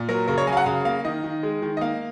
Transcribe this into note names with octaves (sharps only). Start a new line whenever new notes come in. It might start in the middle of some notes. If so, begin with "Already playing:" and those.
Already playing: A#2
F#3 A#4
C#3 A#4
C#5
F#3 G#5
F5
F#5
C#3 F5
A#3 F5
D#3 D#5
D#3
G#3
D#3
D#5
A#3 F5